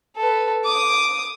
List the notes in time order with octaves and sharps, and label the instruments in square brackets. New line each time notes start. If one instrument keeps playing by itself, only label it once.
[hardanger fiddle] A4 B4
D6 D#6